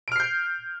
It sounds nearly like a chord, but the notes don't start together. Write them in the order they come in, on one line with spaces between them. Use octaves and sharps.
D7 F6 C7 G6